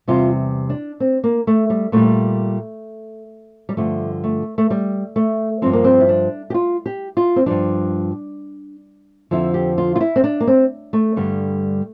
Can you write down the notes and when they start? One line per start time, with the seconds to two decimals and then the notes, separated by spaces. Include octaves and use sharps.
0.08 E2 C3 G3 F4
0.70 D4
1.00 C4
1.24 A#3
1.47 A3
1.70 G3
1.92 A#2 G3 A3
3.69 G3
3.77 G2 D3 F3 A3
4.24 A3
4.58 A3
4.70 G3
5.16 A3
5.62 G2 F3 C4
5.73 A#3
5.84 C4
6.00 E4
6.09 D4
6.50 G4
6.54 F4
6.86 G4
7.17 F4
7.36 C4
7.46 G2 F3 D4
9.31 F2 D3 F3 E4
9.54 G4
9.78 F4
9.96 F4
10.01 E4
10.16 C4
10.24 D4
10.40 A#3
10.47 C4
10.93 A3
11.16 G2 D3 G3